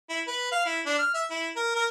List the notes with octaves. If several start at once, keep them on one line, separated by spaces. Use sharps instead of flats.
E4
B4
F5
E4
D4
F6
E5
E4
A#4
A#4